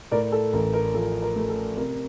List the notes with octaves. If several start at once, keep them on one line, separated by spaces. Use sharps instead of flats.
A2 A#4 D5
A4
A1 A#4
A#4
F3 A4
A#4
A3
A4
C3 A#4